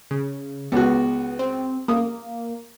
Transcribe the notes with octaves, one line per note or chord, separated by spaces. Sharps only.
C#3
C#2 B3 F#4
C4
A#3 D#6